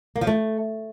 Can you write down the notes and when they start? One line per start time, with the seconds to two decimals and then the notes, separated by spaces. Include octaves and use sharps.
0.16 A#3
0.21 F3
0.27 A3